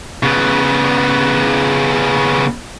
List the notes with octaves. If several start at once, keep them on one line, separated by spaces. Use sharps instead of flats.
C#3 B3